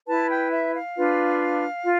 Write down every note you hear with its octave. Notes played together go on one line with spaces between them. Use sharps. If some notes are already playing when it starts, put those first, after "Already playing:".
E4 B4 A5
G5
E5
F5
D4 F4 B4
F4